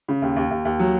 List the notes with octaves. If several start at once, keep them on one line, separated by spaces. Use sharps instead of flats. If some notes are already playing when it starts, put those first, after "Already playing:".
C#3
D#2
D#2
D#2
D#2
F#3